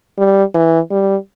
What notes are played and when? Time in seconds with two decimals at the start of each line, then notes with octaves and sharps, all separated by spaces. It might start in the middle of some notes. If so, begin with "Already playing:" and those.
0.18 G3
0.54 E3
0.91 G3